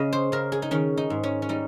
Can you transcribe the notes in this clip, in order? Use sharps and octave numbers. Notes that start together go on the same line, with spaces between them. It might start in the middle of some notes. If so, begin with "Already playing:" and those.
Already playing: C#3 C#4 D#5
C5
C#3 A#4
G#4
D#4
D#3 C#4
D#4
G#2
C#4
C#4
G3 D#4